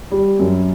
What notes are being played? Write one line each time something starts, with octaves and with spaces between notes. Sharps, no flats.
G3
F#2